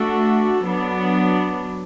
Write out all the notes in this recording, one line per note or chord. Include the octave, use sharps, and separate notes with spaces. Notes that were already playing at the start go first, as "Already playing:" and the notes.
Already playing: A3 D4 F#4 A4
F#3 B3 D4